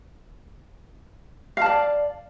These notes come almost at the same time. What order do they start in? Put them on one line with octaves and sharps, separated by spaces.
F5 A5 D5